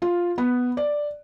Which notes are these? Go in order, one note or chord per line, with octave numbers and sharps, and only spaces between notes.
F4
B3
D5